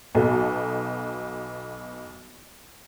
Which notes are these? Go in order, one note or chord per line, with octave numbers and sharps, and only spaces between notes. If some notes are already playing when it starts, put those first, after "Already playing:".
B1 B2 F#4 A4